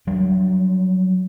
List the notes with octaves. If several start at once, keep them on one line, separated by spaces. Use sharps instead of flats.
F#3 G3 D4